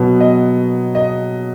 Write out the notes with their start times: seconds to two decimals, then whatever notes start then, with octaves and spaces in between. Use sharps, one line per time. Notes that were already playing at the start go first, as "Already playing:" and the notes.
Already playing: B2 F#3 B3
0.20 D#5
0.95 D#5